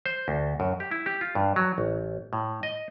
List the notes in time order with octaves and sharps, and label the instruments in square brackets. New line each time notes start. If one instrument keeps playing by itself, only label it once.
[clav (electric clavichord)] C5
D2
F#2
G4
E4
G4
F4
G2
F#3
A1
A2
D#5